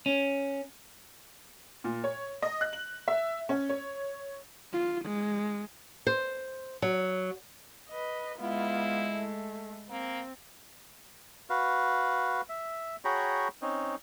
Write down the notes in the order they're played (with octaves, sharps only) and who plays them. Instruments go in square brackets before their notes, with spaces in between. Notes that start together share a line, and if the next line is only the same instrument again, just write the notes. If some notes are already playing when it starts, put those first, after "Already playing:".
[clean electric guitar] C#4
[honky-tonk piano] A#2
C#5
D#5
F#6
F#7
E5
C#4
C#5
[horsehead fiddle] F4
G#3
[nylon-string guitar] C5
F#3
[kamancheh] B4 D#5
[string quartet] G#3 [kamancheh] B3 F4 [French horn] E4
[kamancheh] A3
[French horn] A#3 [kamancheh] C4
[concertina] F#4 B4 F5
E5
F#4 G#4 C#5 G5 A#5 B5
C4 C#4 D#4